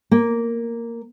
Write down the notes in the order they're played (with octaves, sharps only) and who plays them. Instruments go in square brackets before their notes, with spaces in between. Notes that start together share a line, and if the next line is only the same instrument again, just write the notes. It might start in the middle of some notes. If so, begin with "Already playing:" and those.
[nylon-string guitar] A#3